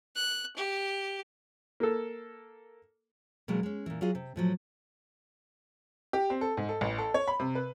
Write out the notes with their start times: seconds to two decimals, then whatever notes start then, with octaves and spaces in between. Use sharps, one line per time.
0.16 F#6
0.56 G4
1.80 A#3 A4
3.48 B2 E3 F#3 G#3 A#3
3.63 G#3 C#4
3.86 A#2 E3
4.01 F#3 F4 G#4
4.15 C3
4.36 A2 F3 F#3
6.13 G4
6.30 C4
6.41 A4
6.57 G#2
6.69 A4
6.81 A1
6.98 A4
7.14 C#5
7.28 B5
7.40 C3
7.55 B4